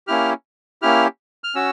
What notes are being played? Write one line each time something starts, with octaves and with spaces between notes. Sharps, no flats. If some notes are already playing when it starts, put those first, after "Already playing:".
A#3 C#4 E4 G4 F6
A#3 C#4 E4 G4 F6
F6
C#4 F#4 E6